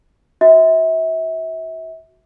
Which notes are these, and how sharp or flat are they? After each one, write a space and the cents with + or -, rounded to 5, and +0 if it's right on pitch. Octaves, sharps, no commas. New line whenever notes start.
F#4 +0 E5 -30